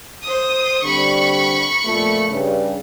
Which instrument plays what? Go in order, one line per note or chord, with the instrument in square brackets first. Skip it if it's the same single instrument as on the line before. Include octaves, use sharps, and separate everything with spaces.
[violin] C5 D#6
[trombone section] D3 G3 C4 [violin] B5 C#6
[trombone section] F2 A#2 A3
G2 C#3